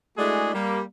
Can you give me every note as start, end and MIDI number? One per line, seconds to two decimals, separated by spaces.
0.17 0.53 56
0.17 0.53 57
0.17 0.53 62
0.17 0.53 64
0.17 0.53 66
0.17 0.53 68
0.54 0.81 55
0.54 0.81 58